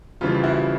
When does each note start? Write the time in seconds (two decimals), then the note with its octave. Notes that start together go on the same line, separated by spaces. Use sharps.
0.21 F2 C#3 E3 G3 C4 F4
0.43 E4 F#4